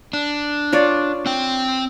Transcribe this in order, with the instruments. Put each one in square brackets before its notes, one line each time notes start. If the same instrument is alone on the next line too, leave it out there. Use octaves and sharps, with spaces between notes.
[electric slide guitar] D4
[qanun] F4 C#5 D5
[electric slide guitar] C4 G5